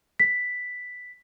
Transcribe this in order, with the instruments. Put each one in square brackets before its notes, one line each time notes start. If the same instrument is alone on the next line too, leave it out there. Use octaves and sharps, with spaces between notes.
[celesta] B6